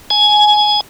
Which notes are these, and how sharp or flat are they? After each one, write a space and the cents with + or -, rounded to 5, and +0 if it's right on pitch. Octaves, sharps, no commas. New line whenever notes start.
G#5 +15